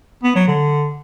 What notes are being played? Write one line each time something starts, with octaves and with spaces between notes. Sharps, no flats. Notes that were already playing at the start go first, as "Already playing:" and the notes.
B3
F#3
D3